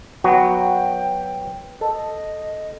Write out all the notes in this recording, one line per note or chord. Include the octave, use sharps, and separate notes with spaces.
F#3 B3 F#4 G5
A4 D#5